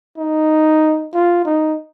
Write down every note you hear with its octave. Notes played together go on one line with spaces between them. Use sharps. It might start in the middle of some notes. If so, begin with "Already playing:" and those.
D#4
F4
D#4